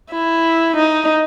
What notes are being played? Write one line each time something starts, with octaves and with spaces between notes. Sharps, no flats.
E4
D#4